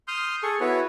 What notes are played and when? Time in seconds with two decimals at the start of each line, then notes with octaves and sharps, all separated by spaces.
0.08 C6 D#6 F6 G6
0.43 G#4 A4 C#6
0.60 B3 E4 F#4 B4 C#5